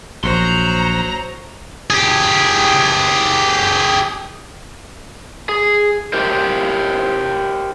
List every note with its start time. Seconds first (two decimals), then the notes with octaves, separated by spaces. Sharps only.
0.24 A#1 F#3 C5 A#5 C6
1.90 G4 G#4
5.49 G#4
6.13 G4 A#4 C5